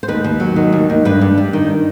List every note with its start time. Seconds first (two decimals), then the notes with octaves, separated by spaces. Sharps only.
0.03 C5
0.08 D#2 B4
0.24 D#2
0.40 F#3
0.56 D#3
0.73 D#2
0.90 D#2
1.05 G2 B4
1.21 G2
1.38 G3
1.53 D#3